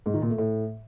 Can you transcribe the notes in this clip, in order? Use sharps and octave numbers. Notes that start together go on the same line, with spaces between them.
G#2
D#3
A#2
A3
A2